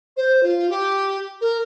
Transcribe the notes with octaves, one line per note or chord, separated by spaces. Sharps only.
C5
F4
G4
A#4